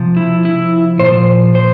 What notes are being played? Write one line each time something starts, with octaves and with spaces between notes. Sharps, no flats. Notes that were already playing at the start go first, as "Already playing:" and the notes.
Already playing: C3 F3
E4
E4
A#2 C5
F3
C5